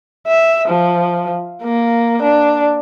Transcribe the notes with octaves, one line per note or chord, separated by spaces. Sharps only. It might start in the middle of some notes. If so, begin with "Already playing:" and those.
E5
F3
A#3
D4